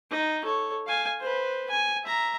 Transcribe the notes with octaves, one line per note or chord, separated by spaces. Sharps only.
D#4
A4 C#5
F5 G#5
B4 C5
G#5
E5 A#5